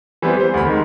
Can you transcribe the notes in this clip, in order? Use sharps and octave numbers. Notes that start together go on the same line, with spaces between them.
E3 G3 B3 C4
G3 C5
D2 B5
D#3 G#3